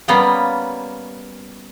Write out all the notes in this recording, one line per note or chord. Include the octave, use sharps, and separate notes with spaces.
G3 A#3 B3 C#4 F5 G5